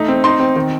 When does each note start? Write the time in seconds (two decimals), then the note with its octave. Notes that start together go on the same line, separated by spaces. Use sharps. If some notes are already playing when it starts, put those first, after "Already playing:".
Already playing: A3 D#4
0.08 C4
0.24 D#4 C6
0.40 C4
0.56 D#3